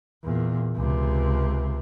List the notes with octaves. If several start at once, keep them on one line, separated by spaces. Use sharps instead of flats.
E2 A#2
C#2 C3